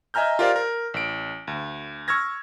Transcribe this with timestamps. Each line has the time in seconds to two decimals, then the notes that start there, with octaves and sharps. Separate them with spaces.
0.14 D#5 E5 G#5 A#5 F6 G6
0.39 F4 G4 A#4 C5 D5 F5
0.56 A#4
0.94 A1 D7
1.47 D2
2.08 C#6 E6 F6 G#6 A#6